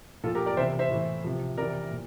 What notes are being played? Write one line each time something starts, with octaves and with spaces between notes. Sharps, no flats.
A#2 F3 F4 A4
G4 A#4
A#4 D5
C3 E3 C5 E5
C5 E5
A2 E3
C3 F3
C3 E3 A#4 D5
A#2